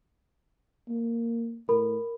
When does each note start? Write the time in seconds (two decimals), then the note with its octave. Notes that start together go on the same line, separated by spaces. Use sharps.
0.89 A#3
1.69 A2 A#4 B5